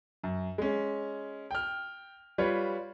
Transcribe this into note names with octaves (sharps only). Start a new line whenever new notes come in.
F#2
G#3 C#4
G5 F6
G3 F4 B4 C#5